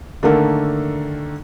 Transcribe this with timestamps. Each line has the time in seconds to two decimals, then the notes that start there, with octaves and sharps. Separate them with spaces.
0.23 D3 D#3 A3 A#3 A4 A#4